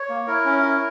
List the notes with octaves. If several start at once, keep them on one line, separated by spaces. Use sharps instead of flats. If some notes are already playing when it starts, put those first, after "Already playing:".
Already playing: C#5
A#3
E4 A#4
C#4
E4